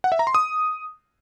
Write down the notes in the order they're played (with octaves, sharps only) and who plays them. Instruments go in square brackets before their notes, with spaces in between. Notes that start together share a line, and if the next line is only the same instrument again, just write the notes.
[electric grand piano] F#5
E5
A#5
C6
D#6